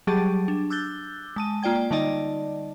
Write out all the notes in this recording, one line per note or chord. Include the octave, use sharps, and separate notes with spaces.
F#3 G3 G4 G#4 A5 A6
D4
D6 E6 F#6 G6 A6 G7
G#3 A5 D#7
A#3 F4 D5 G5 G#6
D3 G3 D#4 D5 D#5 A5